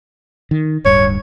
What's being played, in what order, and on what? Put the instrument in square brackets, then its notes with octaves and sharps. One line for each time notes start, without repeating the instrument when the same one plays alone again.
[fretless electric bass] D#3
[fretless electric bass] D1 G2 [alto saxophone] C#5